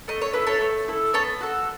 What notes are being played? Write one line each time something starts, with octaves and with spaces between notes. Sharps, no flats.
A3 D#5
C#5
E4 A4 B4
A4 C#5
A3
E4 A4
B3 A4 C#5
F#4 A4